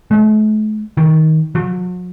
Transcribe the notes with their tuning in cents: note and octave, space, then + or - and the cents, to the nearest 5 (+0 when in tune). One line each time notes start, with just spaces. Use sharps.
A3 -40
D#3 +15
F#3 -45